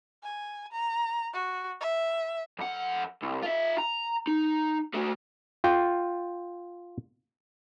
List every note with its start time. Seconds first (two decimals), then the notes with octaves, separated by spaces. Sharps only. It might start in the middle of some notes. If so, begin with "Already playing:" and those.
0.23 G#5
0.72 A#5
1.33 F#4
1.81 E5
2.59 F2 F#5
3.22 C2
3.43 F4 E5
3.78 A#5
4.27 D#4
4.94 A3 F#4
5.64 F4 G5